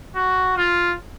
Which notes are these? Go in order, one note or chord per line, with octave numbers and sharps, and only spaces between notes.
F#4
F4